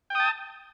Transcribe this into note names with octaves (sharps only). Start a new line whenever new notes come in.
G5 A5 D#6